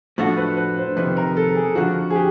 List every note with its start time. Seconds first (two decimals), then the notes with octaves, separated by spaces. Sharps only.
0.18 A2 F3 A3 D4 F#4 A4
0.37 B4
0.57 B4
0.78 C5
0.97 F2 C3 D#3 B4
1.17 A#4
1.37 A4
1.55 G#4
1.75 F2 D3 F3 F#4
2.10 G#4
2.15 G4